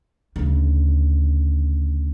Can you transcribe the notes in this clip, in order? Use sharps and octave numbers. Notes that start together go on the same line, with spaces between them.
D2 C#3